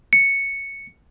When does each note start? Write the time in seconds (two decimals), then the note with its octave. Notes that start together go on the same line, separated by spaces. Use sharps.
0.13 C#7